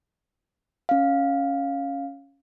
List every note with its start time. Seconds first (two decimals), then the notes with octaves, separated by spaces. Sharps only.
0.89 C#4 F5